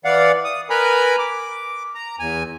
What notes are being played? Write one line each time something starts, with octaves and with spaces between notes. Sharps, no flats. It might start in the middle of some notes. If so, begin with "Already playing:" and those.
E3 D5 F5 F#5
D#6
A#4 B4 G#5 A#5 B5
D6
A#5
E2 G#5